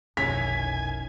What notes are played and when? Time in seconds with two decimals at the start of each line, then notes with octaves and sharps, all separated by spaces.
0.17 F1 B1 D#3 C#4 E4 G#5 B6